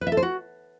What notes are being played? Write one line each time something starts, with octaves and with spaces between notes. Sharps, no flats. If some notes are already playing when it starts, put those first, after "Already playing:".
B4
E5
A4
C5
F#4